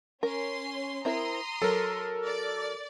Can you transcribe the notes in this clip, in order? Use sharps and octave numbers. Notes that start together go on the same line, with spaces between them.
C#4 A#4 C6
C4 E4 A#4 A#5 C6 D#6
F#3 A4 A#4
D5